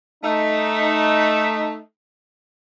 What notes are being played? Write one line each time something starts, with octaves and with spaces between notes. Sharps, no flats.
A3 D#4 E5